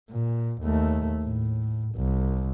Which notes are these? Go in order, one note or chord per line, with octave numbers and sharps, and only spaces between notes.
A#2
D#2 A3
A2
C2